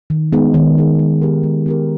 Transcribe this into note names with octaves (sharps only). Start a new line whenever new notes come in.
D#3
G#3 B3 D#4 G#4
D#3
G#3 B3 D#4 G#4
G#3
B3 G4 A#4
G#3
B3 G4 A#4